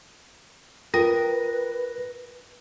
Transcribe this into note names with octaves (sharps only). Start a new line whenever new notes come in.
F4 A#4 B4 G5 A#6